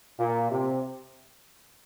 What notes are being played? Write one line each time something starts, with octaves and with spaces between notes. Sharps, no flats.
A#2
C3